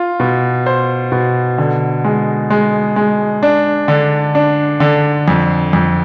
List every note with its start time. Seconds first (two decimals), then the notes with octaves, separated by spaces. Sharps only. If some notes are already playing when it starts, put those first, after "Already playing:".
Already playing: F4
0.20 B2
0.66 C5
1.12 B2
1.58 D3
2.04 G#3
2.50 G#3
2.96 G#3
3.43 D4
3.88 D3
4.35 D4
4.80 D3
5.28 F2
5.73 F2